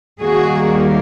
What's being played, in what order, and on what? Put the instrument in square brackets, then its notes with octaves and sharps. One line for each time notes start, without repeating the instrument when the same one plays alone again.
[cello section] D#2 D#3 G3 A#3 F#4 G#4